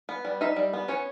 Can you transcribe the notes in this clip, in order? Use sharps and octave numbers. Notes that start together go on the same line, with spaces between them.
B3
G3
D#4 E5
G3
B3
C#4 C#5